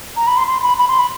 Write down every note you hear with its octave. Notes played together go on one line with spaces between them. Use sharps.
A#5
B5
C6
C6
B5
B5
C6
B5